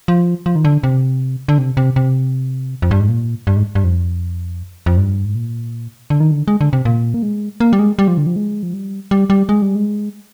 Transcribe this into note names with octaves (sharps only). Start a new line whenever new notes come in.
F3
F3
D#3
D3
C3
D3
C3
C3
C3
F2
G2
G#2
A#2
G2
G#2
G2
F2
F2
G2
G#2
A#2
D3
D#3
D3
G#3
D3
C3
A#2
A#3
G#3
A#3
G3
G#3
G3
F3
D3
F3
G#3
F3
G3
G3
G3
G#3
G3
G#3